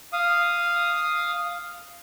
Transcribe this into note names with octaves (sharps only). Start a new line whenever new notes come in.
F5 D#6